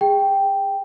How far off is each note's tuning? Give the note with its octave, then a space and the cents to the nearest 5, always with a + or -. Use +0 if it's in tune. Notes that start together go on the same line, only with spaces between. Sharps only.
G#4 -30 G5 +0